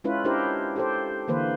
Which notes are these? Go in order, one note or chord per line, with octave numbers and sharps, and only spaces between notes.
G#3 C#4 E4 F4 B4
D4 E4 G4 A#4 C5
G4 A4 C5
D3 E3 A#3 B4 C5